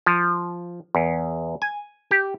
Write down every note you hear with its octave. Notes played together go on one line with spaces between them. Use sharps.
F3
E2
G#5
G4